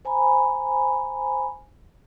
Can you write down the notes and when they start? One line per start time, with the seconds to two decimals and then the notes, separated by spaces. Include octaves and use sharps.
0.05 C5 G#5 A#5 B5